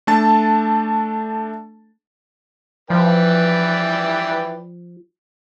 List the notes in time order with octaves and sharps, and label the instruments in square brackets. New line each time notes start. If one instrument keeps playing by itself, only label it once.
[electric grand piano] A3 D4 A4 A5 A6
[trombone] E3 [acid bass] F3 [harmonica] B4 D5 G5